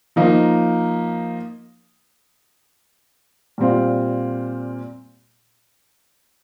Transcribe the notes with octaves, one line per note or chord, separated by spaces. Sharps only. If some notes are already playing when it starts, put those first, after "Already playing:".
F3 A#3 D#4
A#2 G3 C4 F4